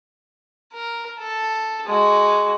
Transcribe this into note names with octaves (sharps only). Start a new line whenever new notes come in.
A#4
A4
G#3 F#4